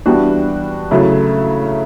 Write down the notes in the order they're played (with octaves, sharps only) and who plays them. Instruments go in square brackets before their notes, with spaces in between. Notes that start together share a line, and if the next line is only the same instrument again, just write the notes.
[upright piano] E3 G3 B3 D4 F#4
C#3 F#3 A3 E4